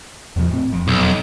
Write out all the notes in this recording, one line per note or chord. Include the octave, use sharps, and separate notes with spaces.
E2 B2 F3
A2 C4
E1 F2
B1